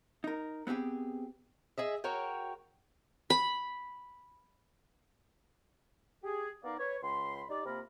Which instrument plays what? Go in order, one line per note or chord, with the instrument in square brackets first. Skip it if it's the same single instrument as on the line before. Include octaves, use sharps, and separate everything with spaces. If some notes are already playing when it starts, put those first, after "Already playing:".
[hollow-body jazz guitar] D#4 A#4
B3 C4 E4 G4 G#4
[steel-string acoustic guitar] G#4 D#5 E5
F#4 A#4 C#5 G5
[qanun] B5
[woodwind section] G4 G#4
B3 D#4 A#4 D5 F5
B4 C#5
C#2 B5 C6
D#4 G4 D5
C3 A#3 F4 A#4 B5